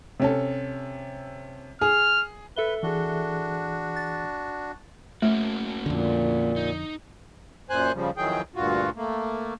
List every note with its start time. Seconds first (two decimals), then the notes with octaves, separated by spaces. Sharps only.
0.20 C3 C#4 A4
1.81 G#4 F6
2.56 A4 B4 E5 G7
2.83 E3 D4 F#4 G#4
3.96 A6
5.22 A3 A#3 C#4 F#4
5.86 F2 A#2 D3
6.56 D#4
7.70 F#2 A#2 C5 G#5 F#6
7.95 C#3 F3 G3
8.17 F2 D#3 E3 F#3 G#4 G5
8.55 D2 G2 A#2 F4 F#4
8.96 A3 A#3